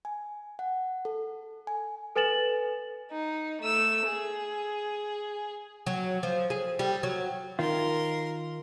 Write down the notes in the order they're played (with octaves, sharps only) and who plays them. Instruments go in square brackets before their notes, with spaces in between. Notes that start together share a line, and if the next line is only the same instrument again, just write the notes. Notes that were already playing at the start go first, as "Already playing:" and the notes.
[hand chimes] G#5
F#5
A4
G#5
[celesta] A4 B4 G#5 A6 E7 F#7
[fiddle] D#4
A3 E6
G#4
[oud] F#3
F3
G#4
G3
F#3
[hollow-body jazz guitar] D#3 F4 [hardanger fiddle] A#4 C6